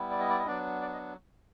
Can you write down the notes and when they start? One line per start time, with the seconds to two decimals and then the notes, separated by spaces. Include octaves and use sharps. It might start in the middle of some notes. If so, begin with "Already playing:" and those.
Already playing: G3 B3 E4
0.11 D5
0.20 D#5
0.29 D5
0.39 D#5
0.46 F#3 B3 D4 D5
0.81 D5
0.93 D#5